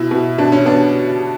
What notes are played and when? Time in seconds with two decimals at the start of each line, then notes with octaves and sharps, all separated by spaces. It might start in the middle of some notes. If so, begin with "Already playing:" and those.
Already playing: B2 E4
0.11 B2
0.38 B2 D4
0.52 C#4
0.66 B3 D4